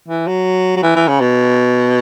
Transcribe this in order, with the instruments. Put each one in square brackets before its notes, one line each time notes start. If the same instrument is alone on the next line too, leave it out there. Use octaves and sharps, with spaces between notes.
[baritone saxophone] E3
F#3
F#3
E3
E3
C#3
B2